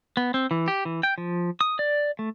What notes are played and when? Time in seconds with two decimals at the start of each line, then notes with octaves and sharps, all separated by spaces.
0.17 B3
0.34 C4
0.51 E3
0.68 G4
0.85 E3
1.03 G5
1.18 F3
1.61 D#6
1.79 D5
2.19 A3